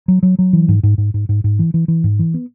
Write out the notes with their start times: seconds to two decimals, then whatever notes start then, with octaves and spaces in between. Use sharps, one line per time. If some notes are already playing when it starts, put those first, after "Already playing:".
0.08 F#3
0.23 F#3
0.39 F#3
0.53 E3
0.68 G#2
0.83 G#2
0.98 G#2
1.14 G#2
1.29 G#2
1.44 G#2
1.59 E3
1.74 E3
1.88 E3
2.04 G#2
2.19 E3
2.34 B3